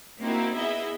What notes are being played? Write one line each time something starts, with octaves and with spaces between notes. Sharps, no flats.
A#3 C4 D#4 E4 F#4
B3 E4 G#4 D#5 E5